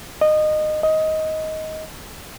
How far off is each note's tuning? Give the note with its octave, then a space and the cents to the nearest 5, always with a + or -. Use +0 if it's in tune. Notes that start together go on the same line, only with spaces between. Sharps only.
D#5 -20
D#5 +15